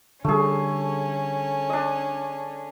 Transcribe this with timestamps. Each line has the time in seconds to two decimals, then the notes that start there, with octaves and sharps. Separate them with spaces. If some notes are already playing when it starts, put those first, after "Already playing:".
0.24 D3 G3 A3 C#4 G#4
1.69 D4 D#5